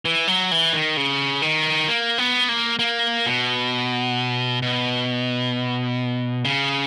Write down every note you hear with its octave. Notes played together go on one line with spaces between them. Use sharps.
E3
F#3
E3
D#3
C#3
D#3
A#3
B3
A#3
A#3
B2
B2
C#3